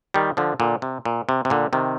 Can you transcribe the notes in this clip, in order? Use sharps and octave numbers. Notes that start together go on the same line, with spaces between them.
D#3 G3
D3 F3
A#2 D3
C3
A#2
C3
C3
A#2 D3
C3 D#3